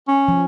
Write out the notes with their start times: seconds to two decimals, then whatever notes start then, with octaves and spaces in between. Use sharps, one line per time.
0.08 C#4
0.28 F3